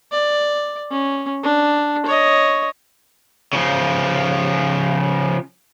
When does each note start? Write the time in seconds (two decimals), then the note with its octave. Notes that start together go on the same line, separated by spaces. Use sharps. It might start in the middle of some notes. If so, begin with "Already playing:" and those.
0.12 D5
0.91 C#4
1.43 D4
2.06 C#5 D#5
3.53 C#3 F3